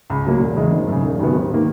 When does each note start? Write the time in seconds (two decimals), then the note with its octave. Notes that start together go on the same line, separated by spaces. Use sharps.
0.10 C#2
0.25 C#3 F#3 A#3
0.40 E1
0.56 E2 C#3 G#3
0.72 G#1
0.87 F#2 C#3
1.03 E1
1.19 D#2 C#3 F#3 B3
1.35 G#1
1.52 D#3 A#3